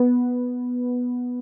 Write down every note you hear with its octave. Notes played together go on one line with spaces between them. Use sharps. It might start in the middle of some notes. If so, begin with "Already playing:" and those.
Already playing: B3